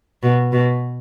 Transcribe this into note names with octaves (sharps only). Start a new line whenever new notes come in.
B2
B2